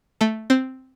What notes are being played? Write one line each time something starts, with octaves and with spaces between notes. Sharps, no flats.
A3 A4
C4 C5